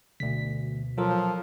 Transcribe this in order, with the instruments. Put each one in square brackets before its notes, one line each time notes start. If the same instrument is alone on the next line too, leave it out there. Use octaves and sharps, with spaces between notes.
[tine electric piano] D2 B6 [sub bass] B2
[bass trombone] F3 [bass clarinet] F#3 [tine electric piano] F4 A4 A#4